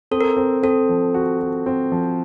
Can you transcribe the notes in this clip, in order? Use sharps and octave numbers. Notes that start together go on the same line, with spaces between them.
C4 A4
A#4
A4
C4
C4 A4
F3
F#4
F#4
C4
F3